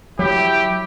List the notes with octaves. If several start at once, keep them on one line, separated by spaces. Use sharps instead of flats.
F#3 E4 G4